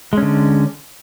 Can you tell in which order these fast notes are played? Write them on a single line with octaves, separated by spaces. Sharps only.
G#3 C#4 D3